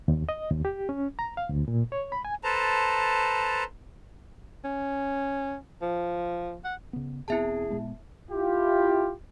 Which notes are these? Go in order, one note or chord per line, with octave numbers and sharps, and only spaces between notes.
D#2
D#5
D#2
G4
C#4
A#5
F5
D2
A#2
C#5
B5
G#5
A4 B4 C5 A5 A#5
C#4
F3
F#5
C#3 B3
E1 B3 C4 E4 G#4 E5 A5
A#2 G#3 B3
E4 F4 G4